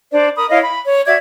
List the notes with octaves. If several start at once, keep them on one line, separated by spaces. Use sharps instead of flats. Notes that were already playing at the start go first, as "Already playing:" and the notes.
D4 C5 D5
A#4 B5 D#6
E4 C#5 D#5 F5
B5
C#5
F#4 D5 E5 G#6